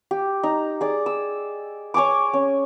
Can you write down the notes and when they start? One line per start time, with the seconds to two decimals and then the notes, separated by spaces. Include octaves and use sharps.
0.11 G4
0.43 D#4
0.81 G#4 D5
1.06 E6
1.94 C#5 G#5 C#6 D6
2.33 C#4